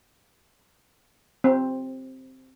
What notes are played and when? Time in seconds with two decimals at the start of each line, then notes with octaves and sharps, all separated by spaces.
1.44 C4